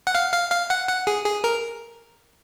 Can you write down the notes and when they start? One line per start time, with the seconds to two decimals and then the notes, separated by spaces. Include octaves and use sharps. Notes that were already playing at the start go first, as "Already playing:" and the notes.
0.07 F#5
0.15 F5
0.33 F5
0.52 F5
0.70 F#5
0.88 F#5
1.07 G#4
1.26 G#4
1.44 A#4